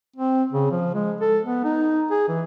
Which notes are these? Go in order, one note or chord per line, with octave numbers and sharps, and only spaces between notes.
C4
C#3
F3
G#3
A4
B3
D#4
G#4
E3